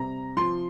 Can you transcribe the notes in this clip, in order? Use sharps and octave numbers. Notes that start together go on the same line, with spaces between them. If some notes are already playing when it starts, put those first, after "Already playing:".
Already playing: C3 G3 A#5
F3 C6